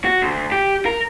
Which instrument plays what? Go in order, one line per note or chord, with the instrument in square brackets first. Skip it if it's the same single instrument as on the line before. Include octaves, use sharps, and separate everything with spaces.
[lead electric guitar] F#4
D2
G4
A#4